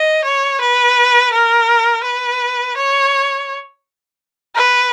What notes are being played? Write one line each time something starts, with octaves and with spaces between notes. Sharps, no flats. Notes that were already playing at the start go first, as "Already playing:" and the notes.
Already playing: D#5
C#5
B4
A#4
B4
C#5
B4